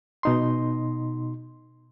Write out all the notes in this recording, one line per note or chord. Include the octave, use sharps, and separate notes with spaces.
B2 D#4 C6